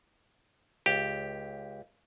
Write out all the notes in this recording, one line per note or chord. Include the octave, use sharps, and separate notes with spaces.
C#2 G4